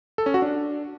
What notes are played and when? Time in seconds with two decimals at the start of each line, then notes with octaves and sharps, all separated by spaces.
0.18 A4
0.26 C#4
0.34 F#4
0.42 D4